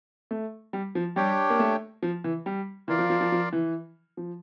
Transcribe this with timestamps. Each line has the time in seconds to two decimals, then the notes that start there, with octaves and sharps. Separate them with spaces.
0.31 A3
0.73 G3
0.95 F3
1.16 G3 D4 G4 C#5 G5
1.50 A#3
1.59 A3
2.03 F3
2.24 E3
2.46 G3
2.88 E3 F4 A#4 D5 F5
2.99 F3
3.10 F3
3.21 F3
3.32 F3
3.53 E3
4.17 F3